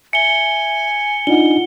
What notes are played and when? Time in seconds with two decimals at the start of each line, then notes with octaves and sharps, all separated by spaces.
0.13 E5 G#5 C#7 G7
1.27 D4 D#4 F4 F#5 G7